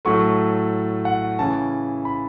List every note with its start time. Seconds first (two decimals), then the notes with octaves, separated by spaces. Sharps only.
0.05 A2 F#3 A3 C#6
1.05 F#5
1.39 C#3 E3 C#4 A5
2.05 B5